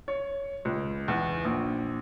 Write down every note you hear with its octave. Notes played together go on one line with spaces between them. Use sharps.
C#5
C#2
E2
A#1